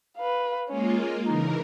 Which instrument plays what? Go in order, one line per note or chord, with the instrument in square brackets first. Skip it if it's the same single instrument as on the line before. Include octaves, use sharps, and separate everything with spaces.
[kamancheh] B4 F5
[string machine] G#3 A#3 F4 [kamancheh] C#4
[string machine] C#3 E3 A#4 [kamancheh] D#4